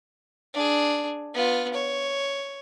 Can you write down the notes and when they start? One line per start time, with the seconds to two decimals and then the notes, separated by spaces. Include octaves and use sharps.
0.54 D4 G#4
1.34 B3 F4
1.74 C#5